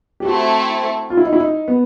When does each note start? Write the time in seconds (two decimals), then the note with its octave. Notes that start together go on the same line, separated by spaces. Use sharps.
0.20 G4
0.25 A3 C4 E4 F#4
1.10 F4
1.17 E4
1.25 D#4
1.33 E4
1.40 D#4
1.68 B3